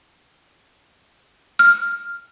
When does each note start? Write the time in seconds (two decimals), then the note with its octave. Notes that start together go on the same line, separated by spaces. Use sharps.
1.59 F6